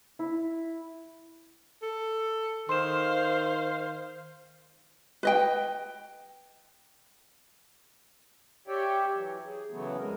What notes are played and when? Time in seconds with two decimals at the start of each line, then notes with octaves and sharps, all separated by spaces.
0.19 E4
1.83 A4
2.69 D#3 C5 F5 C6 E7
5.23 B4 D#5 G5
8.68 G4 C#5 D5 E5 G5
9.15 E3 F#3
9.45 G#4
9.71 C#3 E3 F#3 A3 B3
9.98 F2 G#3 A#4